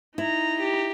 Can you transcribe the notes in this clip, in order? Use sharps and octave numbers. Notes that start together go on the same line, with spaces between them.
D#4 E4 A#5
G4